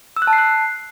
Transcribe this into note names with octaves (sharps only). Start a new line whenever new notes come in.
E6
F#6
A5
C7
F#6